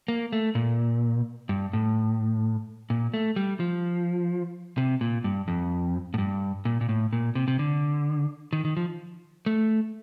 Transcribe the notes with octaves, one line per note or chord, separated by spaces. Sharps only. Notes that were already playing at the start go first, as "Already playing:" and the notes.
A#3
A3
A#2
G2
A2
A#2
A3
G3
F3
C3
A#2
G2
F2
A2
G2
A#2
A#2
A2
A#2
C3
C3
D3
D#3
D#3
F3
A3